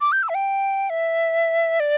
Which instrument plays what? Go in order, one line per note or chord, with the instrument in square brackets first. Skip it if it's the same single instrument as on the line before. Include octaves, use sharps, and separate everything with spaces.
[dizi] D6
G6
E6
E5
G5
E5
D5